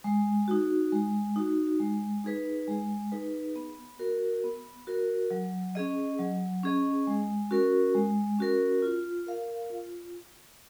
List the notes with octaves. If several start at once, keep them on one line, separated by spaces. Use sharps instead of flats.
G#3
D#4 F#4
G#3
D#4 F#4
G#3
D#4 G#4 B4
G#3
D#4 G#4 B4
B3
F#4 A#4
B3
F#4 A#4
F#3
C#4 G#4 D#5
F#3
C#4 G#4 D#5
G#3
C#4 F#4 A#4
G#3
C#4 F#4 A#4
F4
A#4 F5
F4